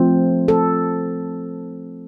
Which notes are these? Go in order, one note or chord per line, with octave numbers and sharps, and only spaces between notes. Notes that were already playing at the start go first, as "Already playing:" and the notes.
Already playing: F3 A3 C4
A4